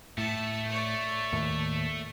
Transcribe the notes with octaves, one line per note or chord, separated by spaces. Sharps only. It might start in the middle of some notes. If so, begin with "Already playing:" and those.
A2 A3 A5
C#5 D5
D#2 A2